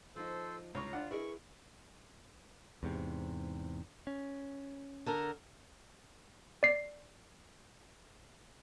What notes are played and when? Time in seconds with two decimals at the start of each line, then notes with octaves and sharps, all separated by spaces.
0.16 F3 A#3 D#4 A4 C5
0.75 C#2 D#4 F4 C#5 A#5 C#6
0.93 D#2 D4 F4 F#5
1.11 E4 G#4 A#4 B4 D#5 C#6
2.83 E2 G#2 C3
4.07 C#4
5.06 D3 A4 A#4
6.63 D5 C7